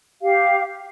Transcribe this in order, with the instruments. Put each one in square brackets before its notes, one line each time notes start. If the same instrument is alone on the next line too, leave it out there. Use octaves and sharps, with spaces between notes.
[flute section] G4 F5